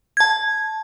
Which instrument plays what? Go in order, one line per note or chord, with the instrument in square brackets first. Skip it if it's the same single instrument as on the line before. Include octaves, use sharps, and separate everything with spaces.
[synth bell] A5 G#6